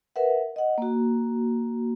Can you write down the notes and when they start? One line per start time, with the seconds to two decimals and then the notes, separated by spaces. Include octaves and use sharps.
0.16 A#4 B4 E5 F#5
0.56 D#5 F#5
0.78 A#3 F#4